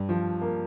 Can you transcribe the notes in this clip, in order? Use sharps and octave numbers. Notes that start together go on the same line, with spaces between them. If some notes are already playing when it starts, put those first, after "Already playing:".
Already playing: G2
F3
A#3